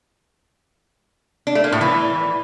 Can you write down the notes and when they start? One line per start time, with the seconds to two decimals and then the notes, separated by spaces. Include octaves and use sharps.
1.47 D4
1.55 A3
1.64 A#3
1.72 A2
1.81 E3